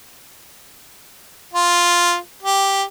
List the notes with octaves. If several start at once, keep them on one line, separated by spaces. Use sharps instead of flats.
F4
G4